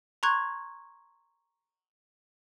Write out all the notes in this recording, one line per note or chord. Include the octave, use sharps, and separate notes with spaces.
A#5 C6 C#6 F#6 G#6